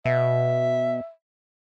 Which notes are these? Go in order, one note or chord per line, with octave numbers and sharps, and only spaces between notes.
B2 E5